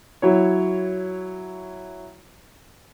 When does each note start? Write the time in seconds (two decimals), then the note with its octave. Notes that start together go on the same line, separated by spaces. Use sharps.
0.22 F#3 E4 C#5